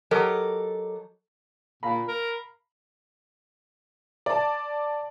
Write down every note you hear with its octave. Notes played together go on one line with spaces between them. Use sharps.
F#3 G4 A4 A#4 D#5
A#2 F5 A#5 B5
A#4
D5 A5